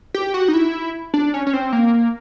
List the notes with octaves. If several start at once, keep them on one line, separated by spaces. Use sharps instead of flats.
G4
F#4
D#4
E4
D4
C#4
C#4
C4
A#3